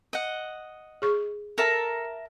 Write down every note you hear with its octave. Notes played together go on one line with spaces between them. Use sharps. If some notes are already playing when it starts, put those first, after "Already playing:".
D#5 F#5
G#4 C#6
A4 A#4 E5 A5